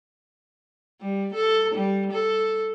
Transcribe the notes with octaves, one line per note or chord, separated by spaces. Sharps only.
G3
A4
G3
A4